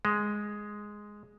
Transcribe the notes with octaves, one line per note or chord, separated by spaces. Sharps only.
G#3